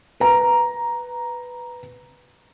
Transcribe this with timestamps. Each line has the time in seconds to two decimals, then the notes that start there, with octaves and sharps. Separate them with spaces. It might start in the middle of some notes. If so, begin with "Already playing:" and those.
0.20 B4 A#5